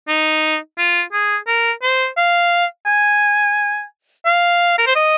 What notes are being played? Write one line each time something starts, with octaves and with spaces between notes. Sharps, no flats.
D#4
F4
G#4
A#4
C5
F5
G#5
F5
A#4
C5
D#5